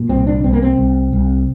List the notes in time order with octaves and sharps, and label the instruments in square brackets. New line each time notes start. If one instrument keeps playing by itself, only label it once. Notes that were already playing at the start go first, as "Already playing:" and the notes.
Already playing: [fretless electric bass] A#2
C2 C4
D4
C2 C4
A#3
C4
C2
C2